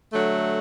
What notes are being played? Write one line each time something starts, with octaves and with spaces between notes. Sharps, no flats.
D3 F#3 A3